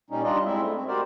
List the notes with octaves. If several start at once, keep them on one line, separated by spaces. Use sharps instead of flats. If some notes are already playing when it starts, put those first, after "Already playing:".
A#2 G3 C#4 D#4
G3 D4 D#4 F4 D5 D#5
G#3 C4 E4 E5
A3
C4
F#4 G4 A#4 C5 D5